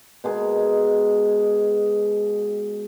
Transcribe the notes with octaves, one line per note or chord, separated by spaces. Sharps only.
B2 G#3 G#4 A#4